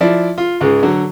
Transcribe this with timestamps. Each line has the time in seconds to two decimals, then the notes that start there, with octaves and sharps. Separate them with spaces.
0.01 F3 E4 D5
0.38 F4
0.61 C#2 G#2 G#3
0.83 D3 F#3